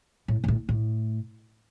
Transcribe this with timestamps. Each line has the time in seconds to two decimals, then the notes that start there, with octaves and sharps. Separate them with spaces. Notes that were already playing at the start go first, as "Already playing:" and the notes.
0.28 A2
0.44 G#2
0.48 A2
0.69 A2